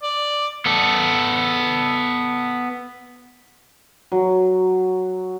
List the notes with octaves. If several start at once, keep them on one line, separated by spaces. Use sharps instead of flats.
D5
B3 A4
F#3